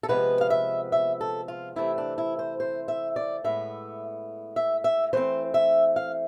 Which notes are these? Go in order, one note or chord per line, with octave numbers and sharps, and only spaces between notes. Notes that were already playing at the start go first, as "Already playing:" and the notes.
A4
C3 F3 G#3 B3 B4
F5
E5
E5
A4
F4
C3 E3 A3 C4 E4
D4
E4
C5
C5
E5
D5
A2 G#3 B3 E5
E5
E5
E3 A3 C4 C5
E5
F5